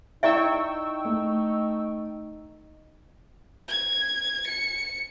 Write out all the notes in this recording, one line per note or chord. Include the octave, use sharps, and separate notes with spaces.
D#4 E4 D5 E5 G5 C#6 E6
A3
G#6
C#7